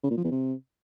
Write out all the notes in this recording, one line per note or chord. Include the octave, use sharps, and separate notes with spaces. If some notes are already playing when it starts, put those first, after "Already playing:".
C#3
A#2
F3
E2
C3